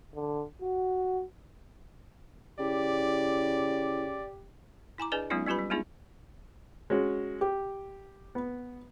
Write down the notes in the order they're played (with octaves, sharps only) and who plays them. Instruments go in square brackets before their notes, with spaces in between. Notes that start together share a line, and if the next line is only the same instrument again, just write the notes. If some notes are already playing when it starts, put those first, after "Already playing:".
[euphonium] D3
F#4
[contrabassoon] C#3 [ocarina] E4 [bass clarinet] G4 [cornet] D5
[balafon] E4 G#5 A#5 D6
D4 G#4 B4 D5 D#5 G#5
F#3 G#3 B3 C#4 D#4 F4
G3 C#4 F4 G4 B4 B5
G3
G#3 B3 D4 D#4 F4 G#4
[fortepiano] G#3 C#4 F#4
G4
B3